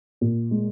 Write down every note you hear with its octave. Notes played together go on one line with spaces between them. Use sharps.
A#2
G#3